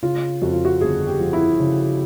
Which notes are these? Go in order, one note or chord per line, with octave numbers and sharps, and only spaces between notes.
C#3 F4
F2 F#4
F4
F#4
G1 G#4
G4
F3
E4
C#3